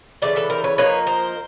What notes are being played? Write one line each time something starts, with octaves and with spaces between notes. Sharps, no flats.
C#3 E3 A3 D5
A4 B4
A#4 C5
B4 C#5
F3 A#3 D#4 B4 C#5
A#4 C5